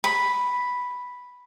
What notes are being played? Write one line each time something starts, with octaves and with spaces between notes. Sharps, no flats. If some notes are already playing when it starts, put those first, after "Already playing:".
B5